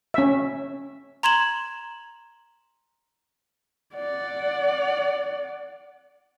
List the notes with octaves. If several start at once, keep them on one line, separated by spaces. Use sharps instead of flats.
C#4 E5
A#5 C6 G#6 E7 F#7
D5 F#5